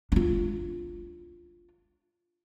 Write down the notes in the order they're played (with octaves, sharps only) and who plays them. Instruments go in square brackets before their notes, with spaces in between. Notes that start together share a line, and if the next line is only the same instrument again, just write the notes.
[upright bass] D4 F4